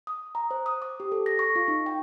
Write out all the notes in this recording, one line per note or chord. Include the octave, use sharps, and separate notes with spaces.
D#6
A#5
C5
D#6
D6
G4
A4
A#6
C#6
F4
D#4
G5